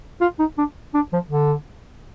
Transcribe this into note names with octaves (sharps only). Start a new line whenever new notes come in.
F4
D#4
D4
D4
F3
D3